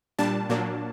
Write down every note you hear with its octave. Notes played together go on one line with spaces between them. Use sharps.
A#2 G3 D4 A5
A#2 F#3 A#3 D4